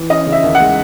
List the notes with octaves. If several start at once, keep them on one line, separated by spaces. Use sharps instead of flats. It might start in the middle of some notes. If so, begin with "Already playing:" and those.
Already playing: E3
C#4 D#5
C#3
E5
D#2
G#3 F#5